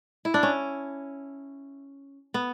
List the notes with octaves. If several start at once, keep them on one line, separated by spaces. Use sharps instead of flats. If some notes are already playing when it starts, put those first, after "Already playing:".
E4
D4
C#4
B3